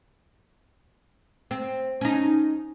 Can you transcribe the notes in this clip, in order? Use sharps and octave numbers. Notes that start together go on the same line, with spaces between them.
C4
C#4 D#4